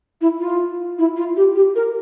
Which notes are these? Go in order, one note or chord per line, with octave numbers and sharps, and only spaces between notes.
E4
F4
E4
F4
G4
G4
A#4